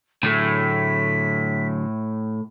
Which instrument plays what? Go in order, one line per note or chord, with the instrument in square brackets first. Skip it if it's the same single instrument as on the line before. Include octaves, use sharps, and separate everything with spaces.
[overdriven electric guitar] A2 [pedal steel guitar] D3 F#3 G#4 [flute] B6